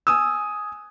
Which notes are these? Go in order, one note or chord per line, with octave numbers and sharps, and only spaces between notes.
G#5 D#6 E6